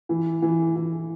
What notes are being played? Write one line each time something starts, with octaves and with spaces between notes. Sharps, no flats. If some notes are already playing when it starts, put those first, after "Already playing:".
E3
E3
E3